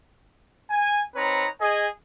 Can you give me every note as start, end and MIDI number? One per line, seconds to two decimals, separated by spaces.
0.69 1.01 80
1.15 1.47 60
1.15 1.47 63
1.15 1.47 71
1.15 1.47 73
1.15 1.47 82
1.15 1.47 84
1.61 1.87 68
1.61 1.87 75
1.61 1.87 80